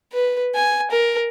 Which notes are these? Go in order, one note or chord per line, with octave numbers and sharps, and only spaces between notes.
B4
G#5
A#4